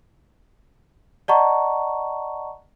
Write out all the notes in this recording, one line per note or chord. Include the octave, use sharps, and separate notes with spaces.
D5 D#5 F#5 A5 A#5 C#6